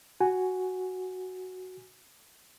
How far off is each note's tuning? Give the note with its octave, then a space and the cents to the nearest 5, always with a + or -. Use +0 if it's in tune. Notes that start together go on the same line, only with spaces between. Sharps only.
F#4 +0 G#5 +0